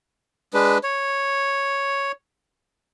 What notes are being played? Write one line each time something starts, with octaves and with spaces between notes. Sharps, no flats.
G#3 D4 B4
C#5